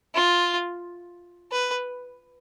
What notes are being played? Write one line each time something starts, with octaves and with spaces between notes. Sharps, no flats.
F4
B4